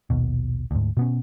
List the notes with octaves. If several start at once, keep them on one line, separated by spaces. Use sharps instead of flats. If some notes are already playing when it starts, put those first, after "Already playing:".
A#1 D#2 B2
D2 G#2
B2 B3 C#4